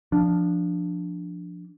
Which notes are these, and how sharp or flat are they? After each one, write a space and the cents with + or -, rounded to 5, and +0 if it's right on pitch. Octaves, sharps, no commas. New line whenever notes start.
F3 +0 D4 +0